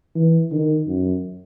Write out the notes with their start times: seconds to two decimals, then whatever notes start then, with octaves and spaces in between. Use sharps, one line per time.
0.15 E3
0.51 D#3
0.87 F#2